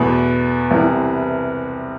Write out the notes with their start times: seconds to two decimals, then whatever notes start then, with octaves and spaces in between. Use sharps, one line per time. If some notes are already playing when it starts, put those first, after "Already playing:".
Already playing: E2 B2 A3 B4
0.71 C2 C3 E3